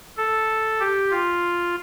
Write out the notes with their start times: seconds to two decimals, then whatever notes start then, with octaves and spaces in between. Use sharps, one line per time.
0.17 A4
0.80 G4
1.10 F4